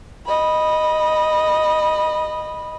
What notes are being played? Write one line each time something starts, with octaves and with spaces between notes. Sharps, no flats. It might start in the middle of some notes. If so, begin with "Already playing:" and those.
D#5 B5